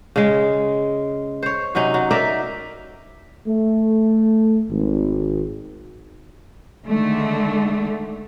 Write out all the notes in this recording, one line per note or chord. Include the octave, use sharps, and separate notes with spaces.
C#3 G#3
C5 C#5
C3 F#3 C#4 D#4
F#3
D#4 A#4 D5 E5
A3
G#1
D3 D#3 G#3 A3